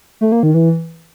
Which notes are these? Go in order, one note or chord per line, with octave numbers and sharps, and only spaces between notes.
A3
A#3
D#3
E3